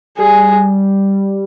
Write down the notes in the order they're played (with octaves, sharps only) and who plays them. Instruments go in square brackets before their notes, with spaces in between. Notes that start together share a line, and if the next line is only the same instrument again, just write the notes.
[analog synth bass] G3 [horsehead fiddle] G#4